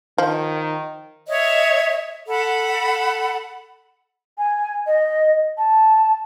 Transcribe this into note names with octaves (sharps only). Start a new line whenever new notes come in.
D#3 F3
C#5 D#5 E5
A4 F#5 B5
G#5
D#5
A5